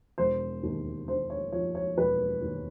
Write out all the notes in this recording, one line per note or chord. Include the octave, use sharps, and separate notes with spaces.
E1 C5
D#2
D3 C5
C#5
F3 C#5
C#5
E1 B4
D#2